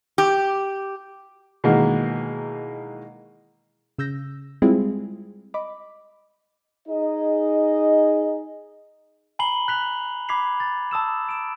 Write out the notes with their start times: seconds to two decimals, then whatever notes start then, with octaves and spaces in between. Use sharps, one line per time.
0.18 G4
1.64 B2 D#3 E3 G#3 A#3
3.98 C#3 E6 G6 A#6
4.62 G3 G#3 C4 E4 F4 G#4
5.54 D#5 B5 D6
6.89 D#4 G#4 D#5
9.39 G#5 A#5 B5 C7 F#7 G7
9.68 F#6 B6 F7
10.29 B5 D6 G#6 B6 C7 F7
10.60 A6
10.91 A5 D#6 E6 E7
11.27 D#6 D7 E7